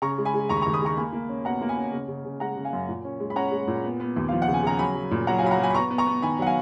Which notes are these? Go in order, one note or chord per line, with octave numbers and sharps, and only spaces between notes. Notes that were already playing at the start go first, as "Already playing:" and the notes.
C#3 A#5 C#6
G#3
G#5 B5
G#3
D#2 A#5 C#6
B5
A#5 C#6
D#2
B5 D#6
G#3 A#5 C#6
A#3 G#5 B5
A#3
C#4
B2 F#5 A#5
A#3
G#5 B5
C#4
C#3
C#3
C#3
G#3 F#5 A#5
C#3
F5 G#5
F#2
A#2
C#4
G#3
B5
C#4 F#5 A#5
G#3
A#2
B3
B3
D#2
F3 F5
F#5
C#3
G#5
C#3 A#5
F#3 G#5 B5
F#3
A#2
F#3 F#5 A#5
F5 G#5
F#3 B5
F#5 A#5
F#3 G#5 B5
B5
B3 A#5 C#6
B3
A#5 C#6
B3
D#3 G#5 B5
F#3 F#5
F5 G#5